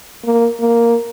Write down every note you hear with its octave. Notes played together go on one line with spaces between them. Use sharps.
A#3
A#3